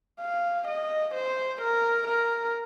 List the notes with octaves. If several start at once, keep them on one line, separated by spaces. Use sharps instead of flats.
F5
D#5
C5
A#4
A#4